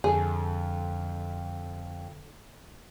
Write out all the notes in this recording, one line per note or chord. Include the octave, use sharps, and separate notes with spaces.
F2 D3 G#4 A4